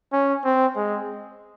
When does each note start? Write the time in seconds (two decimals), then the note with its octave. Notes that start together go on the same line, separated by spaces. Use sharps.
0.13 C#4
0.44 C4
0.76 G#3